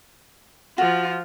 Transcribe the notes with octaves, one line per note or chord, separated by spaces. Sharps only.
F3 F4 F#4